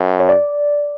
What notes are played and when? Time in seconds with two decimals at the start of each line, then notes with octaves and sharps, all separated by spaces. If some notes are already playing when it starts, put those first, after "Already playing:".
Already playing: F#2
0.20 C#5
0.29 D5